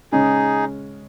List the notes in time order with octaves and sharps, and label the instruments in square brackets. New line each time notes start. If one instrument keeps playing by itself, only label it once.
[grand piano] C#3 G#3 C#4 [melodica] D#4 G#4